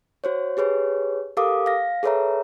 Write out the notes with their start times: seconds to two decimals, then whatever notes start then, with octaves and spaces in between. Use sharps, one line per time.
0.24 F#4 C5 C#5
0.57 G4 G#4 B4 C#5
1.37 G4 A4 A#4 F5 D6 D#6
1.66 F5 A#6
2.03 G#4 A4 B4 C#5 E5 A#5